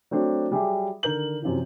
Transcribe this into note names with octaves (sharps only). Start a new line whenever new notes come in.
F#3 A3 C4 D4 F#4
F#3 G3 G4 G#4 E5
D3 D#3 A#4 G6 F#7
F#2 C3 E3 F3